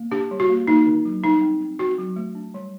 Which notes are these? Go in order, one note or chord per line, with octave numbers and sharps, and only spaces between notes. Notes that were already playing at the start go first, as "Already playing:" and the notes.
Already playing: A#3
D4 G4
G3
F#4
A#3
A#3 D#4
D#3
F#3
G3 D#4
C4
C4
C4 F#4
F#3
A3
D4
G3